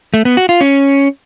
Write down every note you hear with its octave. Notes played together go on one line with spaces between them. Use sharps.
A3
B3
F#4
F4
C#4